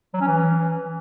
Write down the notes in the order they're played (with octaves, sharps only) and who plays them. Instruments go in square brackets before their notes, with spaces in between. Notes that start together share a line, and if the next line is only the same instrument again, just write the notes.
[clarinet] F#3
C#4
E3